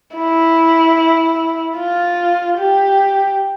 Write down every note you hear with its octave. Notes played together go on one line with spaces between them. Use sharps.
E4
F4
G4